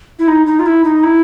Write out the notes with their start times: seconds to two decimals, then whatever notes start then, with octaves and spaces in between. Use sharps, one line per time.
0.19 E4
0.28 D#4
0.46 D#4
0.59 F4
0.66 E4
0.84 D#4
1.03 E4